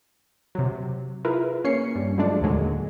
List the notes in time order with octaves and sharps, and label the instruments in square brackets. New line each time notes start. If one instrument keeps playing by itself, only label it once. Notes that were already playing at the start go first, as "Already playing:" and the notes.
[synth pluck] C3 F#3
E4 F4 G#4 A#4 B4 E5
A#3 C#4 C#5 C7 C#7
G2
F3 F#3 G#3 A3 D4 D5
D#2 A2 D3 F#3 G#3 A#3